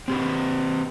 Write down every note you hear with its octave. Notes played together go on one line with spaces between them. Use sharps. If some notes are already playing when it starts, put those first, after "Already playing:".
C4 G4 B4